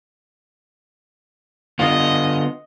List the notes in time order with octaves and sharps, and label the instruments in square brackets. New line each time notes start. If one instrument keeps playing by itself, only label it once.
[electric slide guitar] D3 B3 F4 [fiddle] D#5